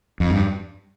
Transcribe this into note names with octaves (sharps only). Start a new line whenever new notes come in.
F2
G2